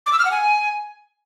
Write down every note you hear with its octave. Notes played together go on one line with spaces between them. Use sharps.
D6
E6
F6
F#5
G#5